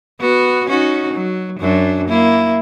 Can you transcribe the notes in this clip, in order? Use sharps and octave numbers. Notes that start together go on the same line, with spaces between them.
B3 F#4
C#4 D#4 F#4
F#3
F#2 F#3 D4
A#3 E4